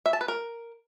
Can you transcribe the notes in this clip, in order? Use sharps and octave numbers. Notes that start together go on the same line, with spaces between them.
E5
A5
B4
A#4